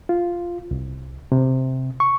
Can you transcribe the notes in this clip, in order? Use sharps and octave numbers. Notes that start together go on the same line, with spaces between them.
F4
C2
C3
C#6